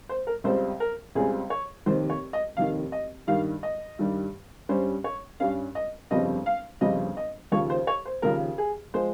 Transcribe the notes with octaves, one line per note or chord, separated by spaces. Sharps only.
C5
A#4
C#2 C#3 G3 C4 C5
A#4
C#2 C#3 G3 C4 G#4
C#5
F1 D#2 D#3 C5
C#5
D#5
F1 D#2 D#3 F5
D#5
G2 D#3 G3 F5
D#5
G2 D#3 G3
G2 G3 C#4 C5
C#5
G2 G3 C#4 F5
D#5
G1 F2 C#3 G3 C4 D#5
F5
G1 F2 C#3 G3 C4 D#5
D#5
D#2 C#3 F3 C#5
C5
C#5
C5
D#2 C#3 F3 A#4
G#4
F3 G#3 C5